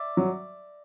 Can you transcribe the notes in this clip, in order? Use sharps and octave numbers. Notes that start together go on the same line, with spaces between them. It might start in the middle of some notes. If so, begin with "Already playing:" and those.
Already playing: D5 E5
F#3